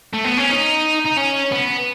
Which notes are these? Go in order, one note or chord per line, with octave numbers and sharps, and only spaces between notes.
A3
B3
C#4
D#4
D#4
C#4
B3